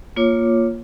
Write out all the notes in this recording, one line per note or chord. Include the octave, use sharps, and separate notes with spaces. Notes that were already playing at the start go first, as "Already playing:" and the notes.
A#3 F4 C#5 D6